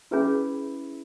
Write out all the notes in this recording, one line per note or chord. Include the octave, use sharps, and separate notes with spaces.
C#4 E4 G#4 B4